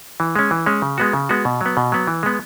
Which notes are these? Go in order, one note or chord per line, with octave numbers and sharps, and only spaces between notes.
E3
G#3 C#4
E3
G#3 C#4
C#3
G#3 B3 F#4
C#3
G#3 B3 F#4
B2
F#3 B3
B2
F#3 B3
E3
G#3 B3